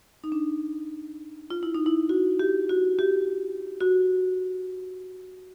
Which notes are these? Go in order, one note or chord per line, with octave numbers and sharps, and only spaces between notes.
D#4
D4
F4
E4
D#4
E4
F#4
G4
F#4
G4
F#4